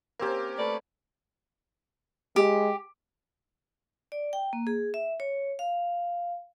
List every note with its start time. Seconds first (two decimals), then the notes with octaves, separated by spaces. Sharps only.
0.20 A#3 C4 C#4 G4 A#4
0.58 A3 B4 D5
2.36 G#3 G4
4.12 D5
4.33 G5
4.53 A#3
4.67 G#4
4.94 E5
5.20 C#5
5.59 F5